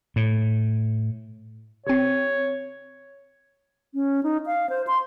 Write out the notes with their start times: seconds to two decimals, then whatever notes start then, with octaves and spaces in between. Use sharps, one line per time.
0.16 A2
1.87 C3 C4 C#5
3.94 C#4
4.23 D#4
4.46 F5
4.70 C5
4.87 C6